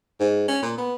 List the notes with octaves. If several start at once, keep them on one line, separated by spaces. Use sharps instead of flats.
G#2
C#4
A#2
B3